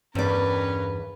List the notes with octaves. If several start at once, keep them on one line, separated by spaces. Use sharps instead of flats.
E2 G2 C#4 A#4 B4 D5